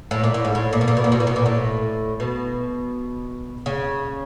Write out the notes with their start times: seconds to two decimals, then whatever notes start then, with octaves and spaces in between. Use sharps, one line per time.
0.11 A2
0.24 A#2
0.34 A2
0.45 G#2
0.55 A2
0.73 A#2
0.81 B2
0.88 A#2
0.97 B2
1.04 A#2
1.12 B2
1.20 A#2
1.27 B2
1.36 A#2
1.46 A2
2.20 B2
3.66 C#3